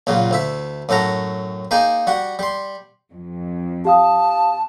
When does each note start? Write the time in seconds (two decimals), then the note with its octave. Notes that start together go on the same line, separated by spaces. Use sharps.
0.07 C#2 A#2 C#3 F#3
0.31 D2 E4 E5
0.89 F#2 A2 A4 F#5 A#5
1.71 A#3 D#4 G#4 G5 G#5
2.07 G3 F#4 F#5
2.39 G3 C6
3.12 F2
3.85 G4 F5 A5 D#6